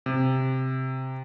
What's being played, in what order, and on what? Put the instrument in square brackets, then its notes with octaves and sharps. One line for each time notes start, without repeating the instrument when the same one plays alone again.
[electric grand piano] C3